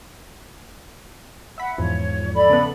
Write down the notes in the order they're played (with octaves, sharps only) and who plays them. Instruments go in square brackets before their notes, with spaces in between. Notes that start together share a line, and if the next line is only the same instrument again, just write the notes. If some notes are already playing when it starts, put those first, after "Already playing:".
[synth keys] E5 B5 [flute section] F#5
[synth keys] E2 G#2 F3 [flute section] C#5
[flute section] A4 D5 B5
[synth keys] C#3 A3 B3